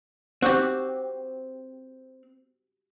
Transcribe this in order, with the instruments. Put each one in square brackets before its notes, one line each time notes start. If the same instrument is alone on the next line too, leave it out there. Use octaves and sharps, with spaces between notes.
[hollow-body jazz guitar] C4 [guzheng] F#4 G4